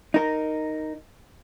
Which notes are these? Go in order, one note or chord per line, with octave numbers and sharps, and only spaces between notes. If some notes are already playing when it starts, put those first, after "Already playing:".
D#4 A#4